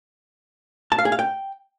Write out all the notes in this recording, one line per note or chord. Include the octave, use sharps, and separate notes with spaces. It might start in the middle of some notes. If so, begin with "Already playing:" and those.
A5
F5
G#4
F5
G5